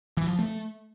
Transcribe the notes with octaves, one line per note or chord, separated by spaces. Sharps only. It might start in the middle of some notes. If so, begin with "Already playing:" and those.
E3
F3
A3